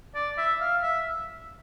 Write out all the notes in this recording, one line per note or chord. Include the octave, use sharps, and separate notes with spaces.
D5
E5
F5
E5